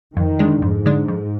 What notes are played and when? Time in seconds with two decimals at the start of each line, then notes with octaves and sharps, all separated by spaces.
0.16 F2 D#3
0.39 D3 G#3 D4
0.62 F2 G#2
0.86 D3 G#3 D4
1.08 F2